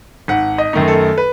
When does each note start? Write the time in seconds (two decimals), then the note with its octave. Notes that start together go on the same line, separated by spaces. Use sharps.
0.28 G#1 F#5
0.58 D#5
0.73 F#2 D#3 A3 D#4
0.88 A4
1.18 B4